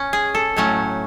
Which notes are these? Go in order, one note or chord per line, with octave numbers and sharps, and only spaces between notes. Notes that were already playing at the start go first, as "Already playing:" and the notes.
Already playing: C#4
G#4
A4
A2 F#3 A3 C#4